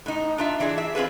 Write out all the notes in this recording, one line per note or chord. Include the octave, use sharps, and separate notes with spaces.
A2 D#4
D4 F4 E5
E3 D4 E4 G#4
E5
C4 F4 G#4 B4